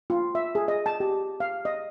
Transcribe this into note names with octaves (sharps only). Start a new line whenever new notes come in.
F4
E5
G#4
D#5
A5
G4
F5
D#5